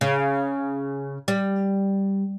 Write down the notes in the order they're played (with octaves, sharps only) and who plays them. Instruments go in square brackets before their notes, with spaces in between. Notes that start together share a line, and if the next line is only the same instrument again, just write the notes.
[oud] C#3
G3